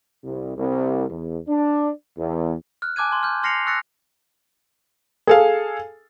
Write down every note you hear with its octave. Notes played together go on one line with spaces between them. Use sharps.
C2
C2
E2
D4
E2
F6 F#6
G#5 A5 D6 F#6 G#6 D#7
C6 G#6
F6 G6
C6 F6 A#6 C7 C#7 F7
C#6 E6 F#6 A6 A#6 C#7
G#4 A4 F5